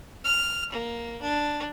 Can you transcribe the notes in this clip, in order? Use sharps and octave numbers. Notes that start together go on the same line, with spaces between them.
F6
A#3
D4